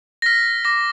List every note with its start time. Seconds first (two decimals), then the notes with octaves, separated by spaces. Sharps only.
0.22 A#6
0.26 F6 B6
0.65 D6 A#6